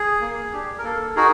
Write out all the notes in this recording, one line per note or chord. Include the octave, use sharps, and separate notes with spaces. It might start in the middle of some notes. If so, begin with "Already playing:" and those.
Already playing: G#4
A#3
D4 G4
A#4
A#3 A4
D#4 F#4 G#4 A#4